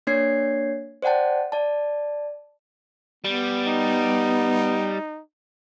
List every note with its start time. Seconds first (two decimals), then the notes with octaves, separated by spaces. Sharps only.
0.07 A#3 D4 C#5 G#6 C7
1.02 C5 D5 F#5 G5 A5
1.52 D5 A5
3.25 G3 B3
3.67 D#4